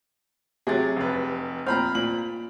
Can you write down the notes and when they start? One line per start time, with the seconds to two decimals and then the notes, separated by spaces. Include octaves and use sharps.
0.67 C3 F#3 G#4 D6 A6
0.97 F1 B4
1.66 A#2 C4 A#5 B5 F6
1.95 A#2 F#7